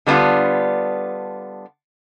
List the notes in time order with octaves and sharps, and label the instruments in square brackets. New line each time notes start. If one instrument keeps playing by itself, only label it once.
[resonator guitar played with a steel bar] D3 G3 B3 D4 F4